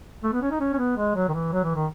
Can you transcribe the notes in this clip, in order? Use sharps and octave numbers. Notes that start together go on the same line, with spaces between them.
A3
B3
C#4
D#4
C#4
C#4
B3
G#3
F#3
D#3
E3
F#3
E3
D#3